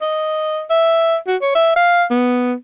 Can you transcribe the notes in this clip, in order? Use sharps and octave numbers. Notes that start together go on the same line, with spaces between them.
D#5
E5
F#4
C#5
E5
F5
B3